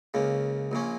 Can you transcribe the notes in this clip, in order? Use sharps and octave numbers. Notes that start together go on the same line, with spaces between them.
C#2 C#3 A#3
A#1 A#2 A#3 C#4